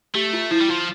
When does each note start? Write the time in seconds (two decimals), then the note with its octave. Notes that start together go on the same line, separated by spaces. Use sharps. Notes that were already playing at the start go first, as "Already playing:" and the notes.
0.15 A3 G4
0.33 F4
0.51 F3 E4
0.60 G3
0.68 F3 F4